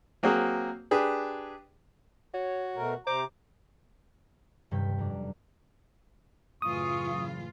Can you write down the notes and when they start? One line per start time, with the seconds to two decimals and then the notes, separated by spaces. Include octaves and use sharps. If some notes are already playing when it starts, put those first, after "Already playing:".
0.23 F#3 A#3 C4 F#4 G#4
0.91 D4 G4 G#4 B4
2.34 F#4 C#5
2.76 B2 A3 A#4
3.07 C3 C5 A#5 D6
4.71 D#1 G2 C3 C#4 G5 B6
4.98 F2 F#3 D4
6.62 F#2 A2 C#3 E3 F4 C#6 D#6